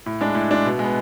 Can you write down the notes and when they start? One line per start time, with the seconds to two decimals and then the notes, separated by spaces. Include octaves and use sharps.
0.06 A2
0.21 G#3 D4
0.35 A2
0.51 G#3 D4
0.65 B2
0.79 G#3
0.84 B3